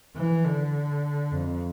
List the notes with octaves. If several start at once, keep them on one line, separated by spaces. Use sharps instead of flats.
E3
D3
F2